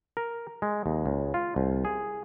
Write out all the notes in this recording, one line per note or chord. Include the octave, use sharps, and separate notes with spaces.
A#4
G#3
D#2
C#2
F4
C2
G#4